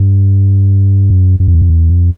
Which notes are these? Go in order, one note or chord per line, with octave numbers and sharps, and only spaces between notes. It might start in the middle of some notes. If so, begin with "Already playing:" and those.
Already playing: G2
F#2
F#2
F2
E2
F2
E2
F2